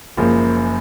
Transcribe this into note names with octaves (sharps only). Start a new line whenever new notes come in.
F#1 F#2 F3 G#3 A#3